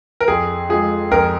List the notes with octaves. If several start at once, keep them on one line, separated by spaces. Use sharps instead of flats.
A#4
F2 G#4
F3 G#3 G#4
F2 A#4